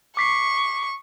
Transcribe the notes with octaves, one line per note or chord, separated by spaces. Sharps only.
C#6 D6 B6 C7